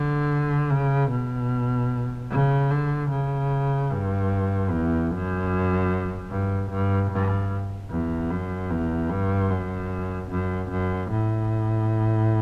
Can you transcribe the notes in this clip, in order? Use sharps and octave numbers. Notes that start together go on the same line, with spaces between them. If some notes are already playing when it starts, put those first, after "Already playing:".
Already playing: D3
C#3
B2
C#3
D3
C#3
G2
E2
F#2
G2
G2
G2
E2
F#2
E2
G2
F#2
F#2
F#2
A2